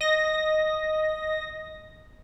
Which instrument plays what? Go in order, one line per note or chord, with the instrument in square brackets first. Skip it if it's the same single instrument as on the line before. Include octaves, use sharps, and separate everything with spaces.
[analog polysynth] D#5 A#6